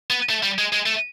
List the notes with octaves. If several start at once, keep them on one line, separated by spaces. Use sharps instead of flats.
B3
A3
G3
G#3
G#3
A3